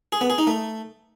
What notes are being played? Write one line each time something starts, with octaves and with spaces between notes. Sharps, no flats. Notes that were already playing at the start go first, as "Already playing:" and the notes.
G#4
B3
G#4
D#4
A3